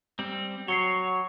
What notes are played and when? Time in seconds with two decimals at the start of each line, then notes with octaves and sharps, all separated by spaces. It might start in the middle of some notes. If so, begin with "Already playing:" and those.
0.19 G3 C4
0.68 F#3 C#5 C7 C#7 G7